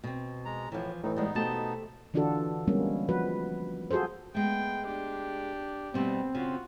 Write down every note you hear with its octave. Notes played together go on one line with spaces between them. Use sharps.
B2 C4
G#3 A#5
A2 E3 F3
A2 E3 D#4
G3 G#3 B3 D#4
B2 A3 G4 C5 A5
D3 E3 D4 F4 F#4 A4
G3 G#3 A#3 B3 C#4
F3 F#4 B4
F4 F#4 G#4 A4 C5
G#3 A3 B3 G5
D4 G4
B2 G3 A3 B3 C4
C#3 F4 F#4